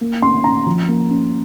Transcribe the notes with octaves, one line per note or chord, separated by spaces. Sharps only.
A#3
C#4 C6
C#4 A#5
F3
A#3
C#4